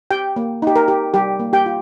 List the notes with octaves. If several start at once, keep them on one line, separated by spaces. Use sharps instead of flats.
G4 G5
A#3
D#4 G4
A#4
G4
G3 G4
A#3
G4 G5
F4